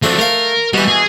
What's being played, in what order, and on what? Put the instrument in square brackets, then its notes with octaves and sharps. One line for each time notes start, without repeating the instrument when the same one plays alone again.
[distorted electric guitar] F3 F#3 [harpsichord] A3 C4 D4
[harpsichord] A3 F5 [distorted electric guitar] A#4
[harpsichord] B2 E3 [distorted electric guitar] G3
[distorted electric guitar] G#4